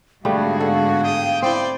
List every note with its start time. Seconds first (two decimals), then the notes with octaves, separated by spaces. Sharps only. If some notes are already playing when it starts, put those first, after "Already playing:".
0.25 G#2 D3 G3 A3 B3 F#4 G#4 F5
0.60 A4 F5
1.04 G4 G5 D#6
1.42 C4 E4 D5 G5 C6